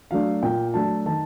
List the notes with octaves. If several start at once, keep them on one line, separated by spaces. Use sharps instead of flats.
F#3 A3 D4 F5
A#2 G5
F#3 A3 D4 A5
D#3 A5